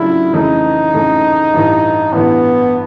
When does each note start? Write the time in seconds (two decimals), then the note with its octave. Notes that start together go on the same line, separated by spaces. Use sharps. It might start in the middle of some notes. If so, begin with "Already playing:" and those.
Already playing: C#3 F#3 A3 D4 E4 F4
0.33 F2 C#3 E3 A3 D#4
0.93 F2 C#3 E3 A3
1.53 A1 G2 E3
2.12 A1 G2 E3 B3